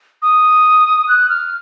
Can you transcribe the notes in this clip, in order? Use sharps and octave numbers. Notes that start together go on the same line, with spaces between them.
D#6
F#6
F6